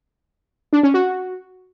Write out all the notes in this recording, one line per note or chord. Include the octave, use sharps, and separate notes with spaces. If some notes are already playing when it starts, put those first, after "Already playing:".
D4
C#4
F#4